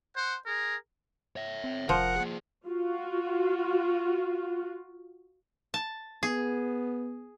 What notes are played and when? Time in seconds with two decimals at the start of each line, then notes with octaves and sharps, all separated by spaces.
0.16 C5 F#5
0.46 G#4 A#4
1.36 C#5 E5
1.64 C4
1.89 F1 F3 A#4 F#5
2.16 A#3 G#4
2.68 F4 F#4
5.74 A5
6.23 B3 G#4